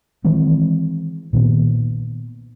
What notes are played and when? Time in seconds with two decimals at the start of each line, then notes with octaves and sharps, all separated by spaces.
0.25 D#3 E3 G#3 C4
1.33 A#2 D#3 B3